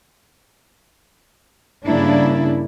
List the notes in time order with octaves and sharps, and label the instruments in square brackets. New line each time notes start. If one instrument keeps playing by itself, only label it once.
[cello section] G2 C#3 A#3 D4 E4